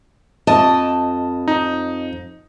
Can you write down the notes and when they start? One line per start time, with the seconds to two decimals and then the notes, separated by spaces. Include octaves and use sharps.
0.47 F2 D#5 A5
1.48 D#4